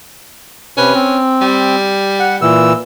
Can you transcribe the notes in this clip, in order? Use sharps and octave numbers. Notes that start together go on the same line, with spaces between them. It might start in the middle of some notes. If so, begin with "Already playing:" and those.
C3 C#4 B4
C4
G3
F#5
A#2 E3 E6